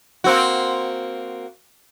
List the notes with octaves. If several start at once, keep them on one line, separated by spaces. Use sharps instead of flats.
A#3 C4 F#4